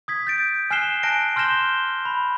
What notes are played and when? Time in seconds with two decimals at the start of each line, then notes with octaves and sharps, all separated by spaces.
0.08 D#6 G#6 B6
0.27 G6 A6 D7
0.71 G#5 F6 F#6 C7 E7 G7
1.03 G#5 A5 F#6 A#6 D7
1.36 C6 F6 G6 A#6 E7 G7
2.05 B5